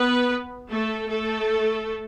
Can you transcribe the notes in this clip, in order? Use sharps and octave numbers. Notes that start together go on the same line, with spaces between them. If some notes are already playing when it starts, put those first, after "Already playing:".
Already playing: B3 B4
A3 A4
A3 A4